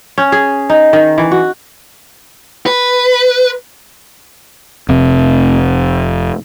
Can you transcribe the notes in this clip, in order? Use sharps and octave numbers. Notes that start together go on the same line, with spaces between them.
C#4
G#4
D#4
D#3
E3
F#4
B4
F1 C3